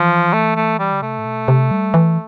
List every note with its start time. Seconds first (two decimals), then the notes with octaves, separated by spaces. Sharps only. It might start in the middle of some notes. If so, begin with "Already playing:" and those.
Already playing: E3 F3
0.33 A3
0.56 A3
0.79 G3
0.92 D3
1.02 C3 A3
1.19 A2
1.25 B2
1.48 C3
1.71 G3
1.94 E3